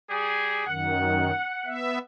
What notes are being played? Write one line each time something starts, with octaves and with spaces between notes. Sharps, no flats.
G3 G#4
F#2 D#3 F#5
B3 E5